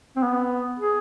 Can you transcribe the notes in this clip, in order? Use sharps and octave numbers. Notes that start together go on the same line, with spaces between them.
C4
B3
G#4